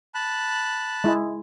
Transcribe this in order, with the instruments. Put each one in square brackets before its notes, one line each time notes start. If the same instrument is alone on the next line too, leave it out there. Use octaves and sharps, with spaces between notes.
[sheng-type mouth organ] A5 B5 F#6
[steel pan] G#3 E4